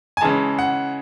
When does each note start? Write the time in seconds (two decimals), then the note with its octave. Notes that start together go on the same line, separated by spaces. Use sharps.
0.17 G#5
0.21 C#3 E3 G#3 A5
0.59 F#5